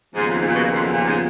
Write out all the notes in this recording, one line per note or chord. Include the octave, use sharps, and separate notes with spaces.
D#2 G#2 C#3 F3 B3 F4
F2
G#2
A#2
B2
A#2
F2
F#2
A#2
G#2